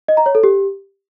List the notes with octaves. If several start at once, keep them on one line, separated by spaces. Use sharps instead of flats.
D#5
A#5
C#5
A4
G4